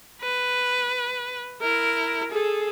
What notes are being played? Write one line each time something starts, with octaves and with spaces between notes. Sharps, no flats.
B4
E4 A#4
G#4 A4